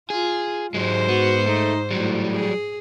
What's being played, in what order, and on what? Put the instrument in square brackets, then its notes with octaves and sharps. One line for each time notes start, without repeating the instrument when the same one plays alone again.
[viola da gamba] F4 [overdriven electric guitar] G#4
[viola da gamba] G#2 C5 [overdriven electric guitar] F#3 G#3
[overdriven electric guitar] B3 [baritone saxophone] F#4
[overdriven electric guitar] A3 [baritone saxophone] D#4
[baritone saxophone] A2 [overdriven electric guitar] F#3 G3
[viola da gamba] G#4